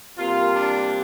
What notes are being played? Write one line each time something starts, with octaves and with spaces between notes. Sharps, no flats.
C3 G3 A#3 F4
D4